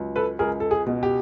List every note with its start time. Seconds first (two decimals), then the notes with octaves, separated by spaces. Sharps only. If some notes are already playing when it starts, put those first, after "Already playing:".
Already playing: C#2 F#3
0.16 A4 B4
0.39 C#2 G#4 A#4
0.60 A4
0.71 G#4
0.87 B2
1.03 G4